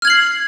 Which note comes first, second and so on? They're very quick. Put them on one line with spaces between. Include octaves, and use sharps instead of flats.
F6 G#6 F#7 C7